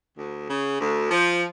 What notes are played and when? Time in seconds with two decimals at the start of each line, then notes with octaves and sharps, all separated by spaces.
0.17 D2
0.47 C#3
0.79 D2
1.10 F3